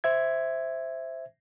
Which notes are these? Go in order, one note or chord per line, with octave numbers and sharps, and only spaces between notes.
C5 E5 G#6